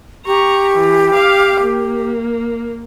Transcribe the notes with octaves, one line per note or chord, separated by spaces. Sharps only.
G4 A#5 C#6
E3
F5 D6
A#3